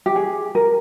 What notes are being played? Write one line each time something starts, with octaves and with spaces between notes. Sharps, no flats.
G4
G#4
A#4